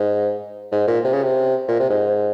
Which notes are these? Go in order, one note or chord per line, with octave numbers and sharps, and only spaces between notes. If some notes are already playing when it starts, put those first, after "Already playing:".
Already playing: G#2
G#2
A#2
C3
C#3
C3
A#2
C3
G#2